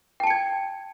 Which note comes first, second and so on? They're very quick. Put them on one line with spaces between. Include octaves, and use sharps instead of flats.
G5 A5 C#7 G#6